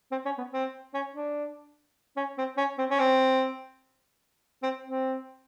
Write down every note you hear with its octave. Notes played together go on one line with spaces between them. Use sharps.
C4
C#4
B3
C4
C#4
D4
C#4
C4
C#4
C4
C#4
C4
C4
C4